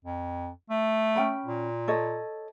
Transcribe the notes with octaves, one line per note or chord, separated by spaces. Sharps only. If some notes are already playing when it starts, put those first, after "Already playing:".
F2
A3
C#4 G5 B5
A#2
A4 C#5 D#5